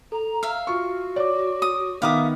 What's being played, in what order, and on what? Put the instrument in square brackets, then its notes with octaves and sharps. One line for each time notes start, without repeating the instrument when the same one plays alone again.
[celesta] A4 [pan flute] A#5
[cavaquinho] E5 F5 [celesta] F6
[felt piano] F4 C#6 [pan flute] F#4
[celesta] C#5 D6 [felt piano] D5
[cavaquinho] D#6
[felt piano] D#3 B3 [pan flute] E5 [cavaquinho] F5 D6 D#6